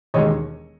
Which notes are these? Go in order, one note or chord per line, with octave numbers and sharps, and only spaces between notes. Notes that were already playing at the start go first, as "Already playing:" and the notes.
E1 D#2 D#3 G#3 C#5 D#5